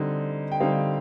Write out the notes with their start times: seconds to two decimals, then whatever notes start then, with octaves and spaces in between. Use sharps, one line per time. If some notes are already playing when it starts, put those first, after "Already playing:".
Already playing: D3 G3 C4 D#4 D#5
0.52 G5
0.60 D3 G3 C4 D#4 F5